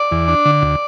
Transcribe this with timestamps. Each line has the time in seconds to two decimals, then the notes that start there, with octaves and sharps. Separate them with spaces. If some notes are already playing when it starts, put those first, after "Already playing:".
Already playing: D5
0.11 E2
0.28 D4
0.45 D3
0.62 D2